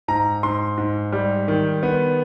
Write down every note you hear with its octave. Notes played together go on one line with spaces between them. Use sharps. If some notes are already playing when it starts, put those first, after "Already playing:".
G#2 A#5
G#2 C6
G#2
G3
D#3
B3